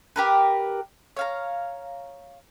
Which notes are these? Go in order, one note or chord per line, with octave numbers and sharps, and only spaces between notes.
G4 A#4 B4
C#5 F5 A#5